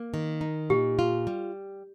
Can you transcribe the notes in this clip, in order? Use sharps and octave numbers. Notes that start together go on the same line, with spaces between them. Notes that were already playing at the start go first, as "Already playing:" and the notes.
Already playing: A#3
D#3
D#4
A#2 G4
F4
G3